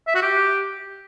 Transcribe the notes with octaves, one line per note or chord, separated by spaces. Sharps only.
E5
F#4
G4